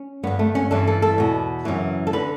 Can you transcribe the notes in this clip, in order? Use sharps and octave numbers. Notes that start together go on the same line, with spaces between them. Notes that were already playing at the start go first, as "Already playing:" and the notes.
Already playing: C#4
G2 D3 B3
A3
C#4
G2 E3 A4
A4
A4
E2 B2
F#2 C#3 E3
A4
D3 B4